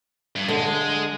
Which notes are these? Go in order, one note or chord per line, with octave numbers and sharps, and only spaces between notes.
G2
D3 G#3